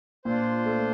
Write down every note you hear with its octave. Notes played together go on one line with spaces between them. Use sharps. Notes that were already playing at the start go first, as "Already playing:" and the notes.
A#2 D4 F4 C5
A3